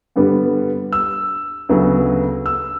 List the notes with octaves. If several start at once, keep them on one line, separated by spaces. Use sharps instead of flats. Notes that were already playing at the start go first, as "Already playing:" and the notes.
G2 D3 G3 B3
E6
D2 C#3 F#3 B3
E6